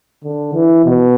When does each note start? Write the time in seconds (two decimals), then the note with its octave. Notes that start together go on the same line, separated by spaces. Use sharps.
0.24 D3
0.54 E3
0.85 B2